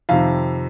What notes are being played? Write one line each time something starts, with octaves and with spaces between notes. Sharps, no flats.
F2 C3 D#3 F5